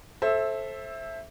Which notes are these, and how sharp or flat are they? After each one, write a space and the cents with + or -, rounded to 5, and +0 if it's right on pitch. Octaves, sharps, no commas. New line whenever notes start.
A4 -10 C5 +25 E5 +0